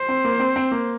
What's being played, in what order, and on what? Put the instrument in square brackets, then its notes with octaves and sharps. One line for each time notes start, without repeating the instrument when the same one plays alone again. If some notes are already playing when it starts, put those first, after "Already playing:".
Already playing: [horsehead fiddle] C5
[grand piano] C4
A#3
C4
C4
A#3